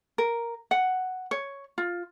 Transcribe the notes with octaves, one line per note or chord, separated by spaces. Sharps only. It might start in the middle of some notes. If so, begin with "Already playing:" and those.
A#4
F#5
C#5
F4